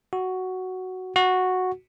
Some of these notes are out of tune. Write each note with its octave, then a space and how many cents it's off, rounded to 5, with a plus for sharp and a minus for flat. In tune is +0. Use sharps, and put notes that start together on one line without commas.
F#4 +5
F#4 -5